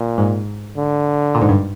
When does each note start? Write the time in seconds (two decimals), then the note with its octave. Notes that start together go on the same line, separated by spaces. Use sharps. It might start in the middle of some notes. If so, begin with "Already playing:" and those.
Already playing: A#2
0.18 G#2
0.76 D3
1.35 A#2
1.42 G#2
1.49 G2